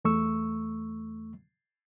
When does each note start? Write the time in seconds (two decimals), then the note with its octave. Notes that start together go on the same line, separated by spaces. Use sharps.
0.05 E2 A3 C#6 E6